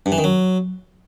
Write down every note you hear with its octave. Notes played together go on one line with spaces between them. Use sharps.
G2
E3
D#3
F#3